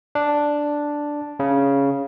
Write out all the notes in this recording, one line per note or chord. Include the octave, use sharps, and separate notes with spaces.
D4
C#3